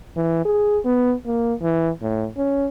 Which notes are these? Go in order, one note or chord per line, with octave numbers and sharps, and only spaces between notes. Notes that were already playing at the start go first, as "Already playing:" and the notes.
E3
G#4
B3
A#3
E3
A2
C#4